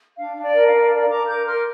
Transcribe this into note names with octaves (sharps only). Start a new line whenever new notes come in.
D4 F5
D4
D5
A#4
F5
D4
A#4 D5
A#4 A#5 D6
A#4 D6 G6
A#4 C6 F6